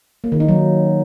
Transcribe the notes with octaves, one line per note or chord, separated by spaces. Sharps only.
A#3
D#3
D#4
F#3